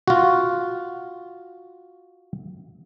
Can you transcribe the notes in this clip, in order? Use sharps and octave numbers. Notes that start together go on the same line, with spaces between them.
F4 F#4